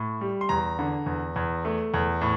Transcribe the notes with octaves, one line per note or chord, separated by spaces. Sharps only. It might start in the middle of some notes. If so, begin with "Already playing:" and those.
Already playing: A2
G3
C6
E2 A#5
D3
E2
E2
A3
E2
A2